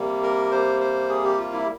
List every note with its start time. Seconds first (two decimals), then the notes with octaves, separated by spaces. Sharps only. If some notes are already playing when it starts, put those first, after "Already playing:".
Already playing: C3 G3 A#3
0.22 A#4
0.51 C5
0.81 C5
1.09 G#4
1.24 G4
1.38 F4
1.53 E4